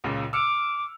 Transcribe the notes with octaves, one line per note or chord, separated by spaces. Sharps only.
C#2 A#2 C#3
D6 E6 F6 C#7